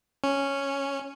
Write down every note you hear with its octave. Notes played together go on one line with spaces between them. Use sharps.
C#4